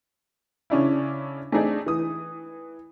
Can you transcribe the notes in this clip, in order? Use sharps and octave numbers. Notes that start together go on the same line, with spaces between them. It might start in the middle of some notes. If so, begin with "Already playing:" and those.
C#3 C#4 D4 E4
A3 C4 D4 D#4 G#4 D5
E3 D#6